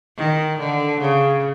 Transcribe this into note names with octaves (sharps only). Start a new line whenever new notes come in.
D#3
D3
C#3